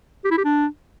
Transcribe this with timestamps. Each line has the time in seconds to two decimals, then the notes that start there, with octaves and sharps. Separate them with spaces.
0.24 G4
0.31 E4
0.38 G4
0.44 D4